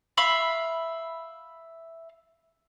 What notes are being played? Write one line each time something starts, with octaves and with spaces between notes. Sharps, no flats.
E5 F5 B5